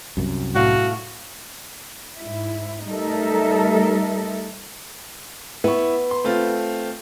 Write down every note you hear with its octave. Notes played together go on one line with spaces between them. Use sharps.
C2 F#2
A2 F#4 F5
G#2 E4
G3 A3 D#4 A4 A#4 E5
B3 E4 C#6
C6
A3 C4 F4